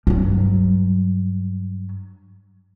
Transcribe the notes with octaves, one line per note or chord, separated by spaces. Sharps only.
G2 F#3